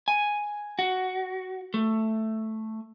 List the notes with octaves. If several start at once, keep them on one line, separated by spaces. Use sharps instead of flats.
G#5
F#4
A3